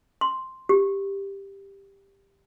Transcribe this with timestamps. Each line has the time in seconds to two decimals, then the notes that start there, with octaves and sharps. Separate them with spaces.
0.21 C6
0.69 G4